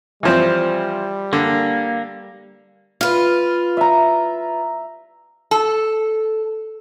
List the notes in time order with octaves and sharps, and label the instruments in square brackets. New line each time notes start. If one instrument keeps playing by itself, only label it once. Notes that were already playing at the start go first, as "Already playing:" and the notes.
[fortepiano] E3 F3 C4 [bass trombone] G3
[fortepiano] D3 [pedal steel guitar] A#3
[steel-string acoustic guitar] F4 B4 [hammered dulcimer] F5
[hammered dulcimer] E5 A#5
[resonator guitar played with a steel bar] A4